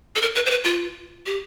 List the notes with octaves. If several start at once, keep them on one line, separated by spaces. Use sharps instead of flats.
A4
A#4
B4
C5
B4
F4
G4